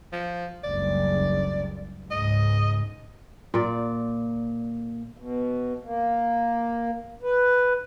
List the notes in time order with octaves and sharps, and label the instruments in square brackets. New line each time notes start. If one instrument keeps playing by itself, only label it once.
[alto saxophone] F3
[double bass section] F#1 C#2 G2 [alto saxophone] D5
[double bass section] C#2 G#2 [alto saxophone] D#5
[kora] A#2 D5
[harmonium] B2
A#3
B4